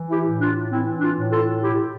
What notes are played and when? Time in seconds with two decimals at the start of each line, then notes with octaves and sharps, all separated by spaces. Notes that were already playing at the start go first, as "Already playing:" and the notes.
Already playing: E3
0.09 E4 G4
0.25 A2
0.40 D4 F4
0.70 E3 C4 E4
1.00 D4 F4
1.16 A2
1.31 F4 A4
1.61 B2 E4 G4